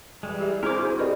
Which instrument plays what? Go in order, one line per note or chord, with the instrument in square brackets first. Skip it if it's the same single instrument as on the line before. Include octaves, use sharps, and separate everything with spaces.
[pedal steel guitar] E3 G3 G#3
[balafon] G4 G#4 E5
[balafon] D4 [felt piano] E4 [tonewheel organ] G#4 C5 [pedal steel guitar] A#4 D6
[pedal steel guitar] C4 D#4 F#4
[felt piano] G4 B4 D#5 [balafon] D5